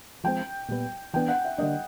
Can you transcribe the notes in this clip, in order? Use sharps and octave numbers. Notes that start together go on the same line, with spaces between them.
F3 G#3 C4 G5
A#2 G3 B3
E3 G3 B3 D4 G5
F#5
E5
D3 G3 A#3 D4 D#5